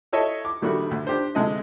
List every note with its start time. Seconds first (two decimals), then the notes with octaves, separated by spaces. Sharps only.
0.12 E4 A4 C#5 D#5 E5
0.45 D6
0.62 A#1 D#3 G3 A3 D4 F#4
0.91 D2
1.07 D4 G4 C5
1.35 D2 C3 G#3 A4 D#5